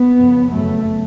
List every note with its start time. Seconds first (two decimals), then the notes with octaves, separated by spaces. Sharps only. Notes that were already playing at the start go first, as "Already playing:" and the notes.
Already playing: B3
0.18 F2 C#3
0.52 F#2 C#3 A3